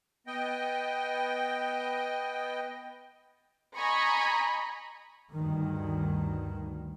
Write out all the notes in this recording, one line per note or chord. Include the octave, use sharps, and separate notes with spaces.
B3 D#5 G5
D#5 G#5 A#5 B5 C#6
D2 G2 D#3